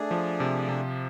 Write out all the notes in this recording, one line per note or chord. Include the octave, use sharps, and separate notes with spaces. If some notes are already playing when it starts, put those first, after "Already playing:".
Already playing: A3 D4 G#4
F3
C3
C3